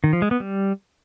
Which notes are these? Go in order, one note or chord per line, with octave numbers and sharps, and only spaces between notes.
D#3
F3
G#3
B3
G3